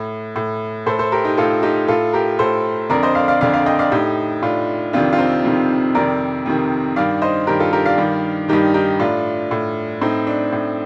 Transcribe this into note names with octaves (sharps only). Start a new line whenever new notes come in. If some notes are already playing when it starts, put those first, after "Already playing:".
Already playing: A2
A2
A2 A4 C5
A4 C5
G4 A#4
D#4 G4
A2 F4 A4
D#4 G4
A2 F4 A4
G4 A#4
A2 A4 C5
F2 D3 A#4 D5
C5 D#5
D5 F5
D5 F5
F2 D3 D5 F5
D5 F5
D#5 G5
D5 F5
A2 D#4 G4
A2 D4 F4
F2 C3 D#3 D4 F4
F4
C4 D#4
F2 C3 D#3
F2 C3 D#3 A#4 D5
F2 C3 D#3
G2 D#3 D5 F5
C5 D#5
G2 D#3 G4 A#4
F4 A4
G4 A#4
D5 F5
G2 D#3
G2 D#3 D#4 G4
D#4 G4
A2 D4 F4
A2
A2 C4 D#4
D4
A2